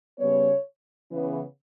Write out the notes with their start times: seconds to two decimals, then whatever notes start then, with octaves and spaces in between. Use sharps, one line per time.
0.19 C#3 G3 B3 C#5
1.10 C#3 E3 B3